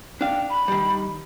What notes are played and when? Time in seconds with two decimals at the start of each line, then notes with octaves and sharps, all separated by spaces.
0.21 D4 F5 G5
0.50 B5
0.68 D#3 G3